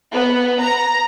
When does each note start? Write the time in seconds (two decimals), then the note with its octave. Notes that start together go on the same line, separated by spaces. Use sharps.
0.12 B3
0.61 A#5